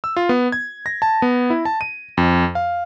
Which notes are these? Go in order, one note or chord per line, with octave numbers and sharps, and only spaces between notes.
E6
F4
B3
G#6
A#6
A5
B3
E4
A5
D#7
F2
F5